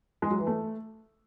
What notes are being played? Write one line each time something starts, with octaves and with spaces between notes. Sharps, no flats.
G#3
F#3
E3
A3